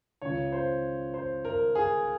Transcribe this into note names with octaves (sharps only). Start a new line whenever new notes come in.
C#2 C#3 C#5
C5
C5
A#4
G#4